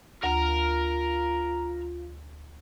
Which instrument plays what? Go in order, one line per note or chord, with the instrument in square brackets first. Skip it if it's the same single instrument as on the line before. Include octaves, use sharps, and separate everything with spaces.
[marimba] D2 [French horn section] F4 [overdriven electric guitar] A#4 A#5